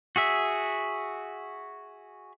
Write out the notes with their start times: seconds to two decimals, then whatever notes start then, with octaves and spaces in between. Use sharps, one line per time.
0.16 F#4 G#4 E5